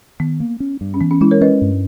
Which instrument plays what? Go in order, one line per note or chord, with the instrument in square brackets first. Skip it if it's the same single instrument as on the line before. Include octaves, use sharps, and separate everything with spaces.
[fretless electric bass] D#3 [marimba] B3
[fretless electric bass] A#3
C#4
G2
[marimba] C#4
[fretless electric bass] E3 [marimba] B3
[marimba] C#4
[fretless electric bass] G#3 [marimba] C#4 E4
[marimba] A#4 C#5
[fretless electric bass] C#4 [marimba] B4 D#5
[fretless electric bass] G2